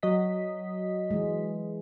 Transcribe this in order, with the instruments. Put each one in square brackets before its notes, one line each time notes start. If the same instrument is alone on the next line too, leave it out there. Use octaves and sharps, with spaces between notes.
[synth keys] F#3 D#5 B6
[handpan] E3 G#3